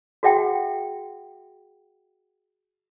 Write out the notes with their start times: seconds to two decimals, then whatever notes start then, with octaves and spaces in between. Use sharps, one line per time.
0.23 F#4 G#4 E5 F#5 G5